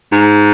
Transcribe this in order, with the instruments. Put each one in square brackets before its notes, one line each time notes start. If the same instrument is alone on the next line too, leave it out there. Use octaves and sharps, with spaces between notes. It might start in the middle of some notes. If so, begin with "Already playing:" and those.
[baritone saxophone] G#2